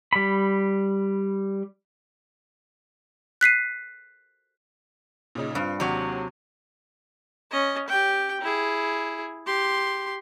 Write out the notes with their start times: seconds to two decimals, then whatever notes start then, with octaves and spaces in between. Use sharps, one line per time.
0.13 G3 B5
3.41 F#6 B6 C7 D#7
5.35 A#2 C#3 D#4
5.55 G2 C4 F4
5.80 D#2 C3 F#3 D4 F#5
7.51 C#4 D#5
7.88 G4 G5
8.41 E4 G#4
9.46 G4 C6